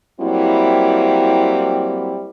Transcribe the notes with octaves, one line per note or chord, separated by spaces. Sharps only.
F#3 G3 A#3 C4 E4